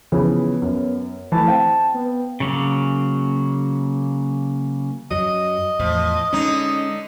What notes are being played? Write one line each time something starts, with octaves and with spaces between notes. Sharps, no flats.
C#3 E3 F3 B3
F#2
E3 A3 A5
C4 F5 G5
B3
C#3 F#3 A#3
F#2 F#3 D#5
E2 A2 F3
D3 G#3 C#4 D#4